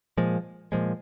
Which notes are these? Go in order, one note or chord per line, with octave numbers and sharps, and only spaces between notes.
A#2 F3 G#3
A#2 F3 G#3